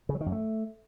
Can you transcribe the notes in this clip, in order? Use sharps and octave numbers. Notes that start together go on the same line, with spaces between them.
C#3
F#3
D#3
F#2
A3